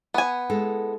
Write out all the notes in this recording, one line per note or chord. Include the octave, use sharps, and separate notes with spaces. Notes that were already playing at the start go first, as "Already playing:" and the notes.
B3 G#5
G#3 E4 A4